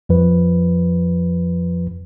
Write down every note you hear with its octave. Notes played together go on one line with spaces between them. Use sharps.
F2 F3 B4